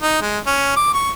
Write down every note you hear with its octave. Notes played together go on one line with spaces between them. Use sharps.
D#4
G#3
C#4
D6
C#6